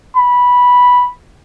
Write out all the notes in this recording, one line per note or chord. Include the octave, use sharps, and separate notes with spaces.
B5